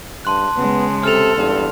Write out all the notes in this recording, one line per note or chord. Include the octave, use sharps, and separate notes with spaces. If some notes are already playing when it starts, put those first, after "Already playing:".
G2 A5 C6 F#6
C#3 G#3 B3
C3 A4 F6 F7
E2 G2